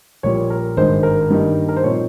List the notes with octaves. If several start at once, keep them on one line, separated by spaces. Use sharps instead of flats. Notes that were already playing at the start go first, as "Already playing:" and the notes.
A#1 A#2 G3 C#5
A#4
G#1 G2 D#3 G#3 C5
A#4
G2 D#3 G3 A#3 D#4
A#4
C5
A#2 F3 C4 D#4 C#5